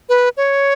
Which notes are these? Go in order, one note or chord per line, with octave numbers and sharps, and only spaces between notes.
B4
C#5